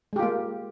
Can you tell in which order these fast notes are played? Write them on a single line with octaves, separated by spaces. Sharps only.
G#3 G4 F4 A#3